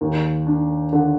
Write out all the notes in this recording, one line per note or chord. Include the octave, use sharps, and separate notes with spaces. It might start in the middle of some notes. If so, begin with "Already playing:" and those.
D#2
D4
D3